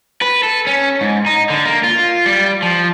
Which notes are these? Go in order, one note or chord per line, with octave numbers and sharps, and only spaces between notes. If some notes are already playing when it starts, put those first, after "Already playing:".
B4
A4
C#4
G#2
D#4
D3
A#3
F4
G3
F3